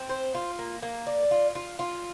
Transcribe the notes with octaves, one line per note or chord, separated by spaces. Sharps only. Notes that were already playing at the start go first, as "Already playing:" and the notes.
Already playing: C4
C5
F4
A#3
A#3
D5
F4
F4
F4